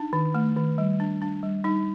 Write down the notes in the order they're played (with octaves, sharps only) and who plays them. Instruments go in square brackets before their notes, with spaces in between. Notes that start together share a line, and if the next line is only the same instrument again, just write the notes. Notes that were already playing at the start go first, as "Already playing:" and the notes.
Already playing: [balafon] D4 D#4
D#3
A3
D#3
G3
D4
D4
G3
G3 D#4